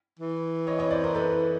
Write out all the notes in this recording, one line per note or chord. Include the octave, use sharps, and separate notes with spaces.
E3
C#5 D#5
C#5 D#5
C5 D5
A#4 C5
A4 B4